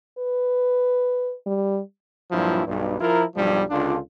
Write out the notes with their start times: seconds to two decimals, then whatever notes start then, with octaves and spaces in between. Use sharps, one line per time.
0.18 B4
1.46 G3
2.31 G2 A#2 F3 F#3 E4
2.66 B1 G2
3.01 F3 E4 F4 A#4
3.36 B1 G2 F3 G3
3.70 C#2 D3 D4 F4